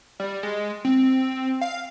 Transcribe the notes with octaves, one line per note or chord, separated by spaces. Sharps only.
G3
G#3
C4
F5